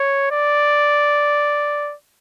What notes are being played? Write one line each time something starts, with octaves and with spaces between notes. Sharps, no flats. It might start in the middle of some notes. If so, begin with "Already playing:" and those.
Already playing: C#5
D5